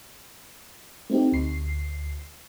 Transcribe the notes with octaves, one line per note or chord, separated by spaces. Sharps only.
A3 C4 D#4 G4
D2 C7